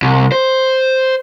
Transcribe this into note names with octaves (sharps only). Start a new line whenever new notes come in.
C2
C5